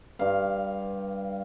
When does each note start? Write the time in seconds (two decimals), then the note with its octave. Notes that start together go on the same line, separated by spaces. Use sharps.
0.19 G2 F5